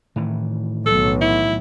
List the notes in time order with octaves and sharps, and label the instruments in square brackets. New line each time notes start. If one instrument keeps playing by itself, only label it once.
[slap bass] A2 D#3 E3
[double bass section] B1 [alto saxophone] A4
[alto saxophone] E4